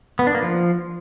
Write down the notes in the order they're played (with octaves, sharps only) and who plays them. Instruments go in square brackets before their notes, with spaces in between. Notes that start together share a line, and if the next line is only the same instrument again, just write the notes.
[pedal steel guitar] B3
D4
A#3
F3